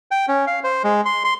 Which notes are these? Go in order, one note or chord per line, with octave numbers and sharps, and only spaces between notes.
G5
C#4
F5
C5
G#3
C6
C6